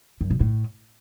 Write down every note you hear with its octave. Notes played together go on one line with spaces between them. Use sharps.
F#2
B2
A2